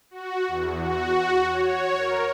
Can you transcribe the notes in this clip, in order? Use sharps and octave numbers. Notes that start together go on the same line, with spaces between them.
F#4
E2
F#4
C#5
A#4